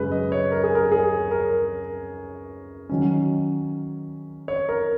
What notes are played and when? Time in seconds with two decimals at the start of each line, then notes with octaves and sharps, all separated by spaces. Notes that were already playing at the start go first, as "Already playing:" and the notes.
Already playing: F#2 C#3 G#3 C#4 B4
0.11 D#5
0.32 C#5
0.52 A#4
0.63 G#4
0.75 A#4
0.92 G#4
1.31 A#4
2.89 D#3 F#3 C#4
4.48 C#5
4.69 A#4